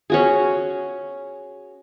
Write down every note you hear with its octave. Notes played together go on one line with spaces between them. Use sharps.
C#4 F#4 G#4